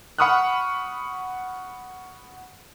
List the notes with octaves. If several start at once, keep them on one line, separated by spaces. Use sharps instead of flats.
F#5 B5 C#6 D#6 F6 F#6